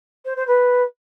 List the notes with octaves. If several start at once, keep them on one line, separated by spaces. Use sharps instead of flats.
C5
C5
B4